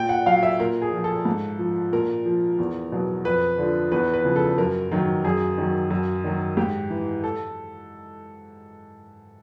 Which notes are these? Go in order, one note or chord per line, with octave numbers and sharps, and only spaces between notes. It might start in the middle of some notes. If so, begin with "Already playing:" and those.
Already playing: A#2 G5
F#5
F#3 F5
E5
A#2 A#4
G#4
F3
A4
G#2
F3
A#2 A#4
F3
E2
B2 F#3
F2 B4
D3 F3
E2 B4
B4
C#3 F3
A4
F#2 A#4
D#3 F#3
F#2 G#4
D#3 F#3
F#2
D#3 F#3
G#2 G4
E3
A4